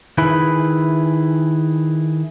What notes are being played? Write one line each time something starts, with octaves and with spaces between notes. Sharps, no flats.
D#3 E4 G#4 B4